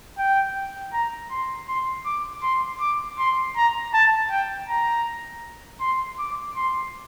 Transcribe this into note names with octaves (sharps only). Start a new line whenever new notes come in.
G5
A#5
C6
C6
D6
C6
D6
C6
A#5
A5
G5
A#5
C6
D6
C6